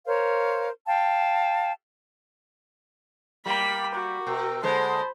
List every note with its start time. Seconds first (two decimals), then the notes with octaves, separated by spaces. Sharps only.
0.06 A#4 C5 C#5 F5
0.87 F5 G5 A5
3.46 G3 A#3 G5 B5
3.95 F#4
4.27 B2 A#4 G5 E6
4.63 D3 G#3 C5 A5 B5